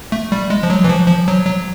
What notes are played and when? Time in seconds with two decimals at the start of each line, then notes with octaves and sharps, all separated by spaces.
0.12 A3
0.32 G3
0.50 G#3
0.63 F3
0.70 F#3
0.84 E3
0.89 F3
1.08 F3
1.28 F#3
1.46 F#3